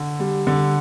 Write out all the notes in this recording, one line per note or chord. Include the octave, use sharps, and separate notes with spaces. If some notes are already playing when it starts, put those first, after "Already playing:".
Already playing: D3
G3
D3